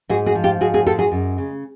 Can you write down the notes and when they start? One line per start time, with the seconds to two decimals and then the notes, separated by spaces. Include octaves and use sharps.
0.09 G#2 F#4 G#4
0.26 F#4 G#4
0.35 F3
0.44 F4 G4
0.61 G#2 F#4 G#4
0.74 F#4 G#4
0.86 G#3 G4 A4
0.99 F#4 G#4
1.12 F#2
1.38 C#3